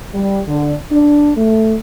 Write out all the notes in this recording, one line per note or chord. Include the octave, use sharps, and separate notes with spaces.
G3
D3
D4
A3